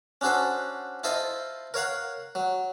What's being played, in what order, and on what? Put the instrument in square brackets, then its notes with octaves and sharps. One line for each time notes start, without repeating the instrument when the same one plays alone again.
[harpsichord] C#4 D4 F#4 A4 C5
E4 F4 A4 C5 D#5
A#4 C#5 F5 F#5
F#3